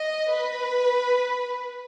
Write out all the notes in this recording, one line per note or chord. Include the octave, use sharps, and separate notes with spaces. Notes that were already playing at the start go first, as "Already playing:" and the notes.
Already playing: D#5
B4